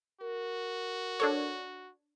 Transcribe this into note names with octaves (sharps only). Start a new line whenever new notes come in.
F#4 A#4
D4 A4 C#5